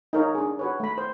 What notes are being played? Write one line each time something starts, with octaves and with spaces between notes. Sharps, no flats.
D#4 A#4 C#5
D4 G#4
F#4 B4 C#5
A3 B5
C5